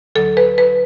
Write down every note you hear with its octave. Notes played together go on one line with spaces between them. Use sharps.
D2 D3 F#3 A4
B4
B4